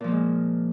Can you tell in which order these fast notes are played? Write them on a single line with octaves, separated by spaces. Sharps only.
A#2 F3 A#3 G#3